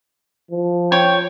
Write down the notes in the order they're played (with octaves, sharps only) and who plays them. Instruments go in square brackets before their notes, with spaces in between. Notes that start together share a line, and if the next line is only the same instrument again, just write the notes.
[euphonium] F3
[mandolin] C#5 [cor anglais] G5